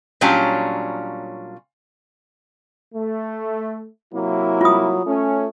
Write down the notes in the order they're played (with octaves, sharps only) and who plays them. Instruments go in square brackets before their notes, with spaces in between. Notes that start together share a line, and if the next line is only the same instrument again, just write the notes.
[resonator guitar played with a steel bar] A#2 F#3 G3 C#4 D4 F4
[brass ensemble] A3
[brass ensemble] C3 A#3 E4 [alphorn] F#3
[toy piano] F4 D#6
[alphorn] A3 [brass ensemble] C#4